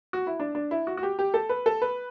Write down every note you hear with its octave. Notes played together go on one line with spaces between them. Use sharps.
F#4
E4
D4
D4
E4
F#4
F#4
G4
G4
A4
B4
A4
B4